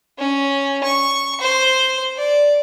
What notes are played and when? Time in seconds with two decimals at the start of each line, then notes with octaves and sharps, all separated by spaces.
0.18 C#4
0.84 C#6
1.41 C5
2.17 D5